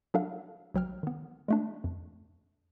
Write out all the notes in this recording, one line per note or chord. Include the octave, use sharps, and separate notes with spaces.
F#3 D4 A4 A#4 F5 F#5
B1 F#3 G5 F6
D#3 B3
G#3 A3 D4
F2